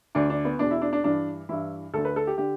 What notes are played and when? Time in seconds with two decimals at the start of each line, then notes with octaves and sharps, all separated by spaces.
0.15 D2 D3 D4
0.30 D4
0.45 B3
0.59 E2 B2 D4
0.71 E4
0.81 D4
0.93 D4
1.04 G2 E3 D4
1.49 G2 E3 E4
1.94 D2 D3 A4
2.05 B4
2.16 A4
2.27 G4
2.38 D3 G4